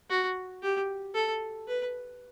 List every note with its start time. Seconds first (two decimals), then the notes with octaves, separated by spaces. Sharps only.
0.10 F#4
0.62 G4
1.15 A4
1.68 B4